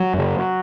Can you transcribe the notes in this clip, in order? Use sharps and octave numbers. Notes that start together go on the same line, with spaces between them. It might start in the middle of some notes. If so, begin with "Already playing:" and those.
Already playing: F#3
F#2 C#3